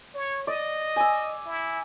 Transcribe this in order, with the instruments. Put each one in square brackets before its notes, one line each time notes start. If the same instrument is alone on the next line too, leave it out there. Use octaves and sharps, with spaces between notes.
[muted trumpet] C#5
[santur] D5 [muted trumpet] D#5
[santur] G#5 E6
[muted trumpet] E4